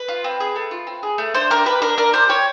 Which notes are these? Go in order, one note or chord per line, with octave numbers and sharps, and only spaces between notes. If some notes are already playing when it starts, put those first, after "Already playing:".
Already playing: B4
F4
C4
G#4
A3
F4
C4
G#4
A3
D4 C5
G4 A#4
G4 B4
D4 A#4
D4 A#4
G4 C5
G4 C#5